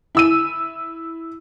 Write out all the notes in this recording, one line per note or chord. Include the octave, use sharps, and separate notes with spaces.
E4 E6 D#7